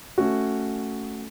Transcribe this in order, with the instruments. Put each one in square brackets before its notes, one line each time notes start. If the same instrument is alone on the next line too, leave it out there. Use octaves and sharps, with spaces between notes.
[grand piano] A3 C#4 F#4